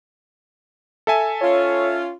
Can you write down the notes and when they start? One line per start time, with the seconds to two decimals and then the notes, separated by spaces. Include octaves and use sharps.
1.07 A4 E5 G#5
1.41 C#4 F4 C#5